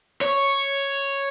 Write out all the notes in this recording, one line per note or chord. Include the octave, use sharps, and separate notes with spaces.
C#5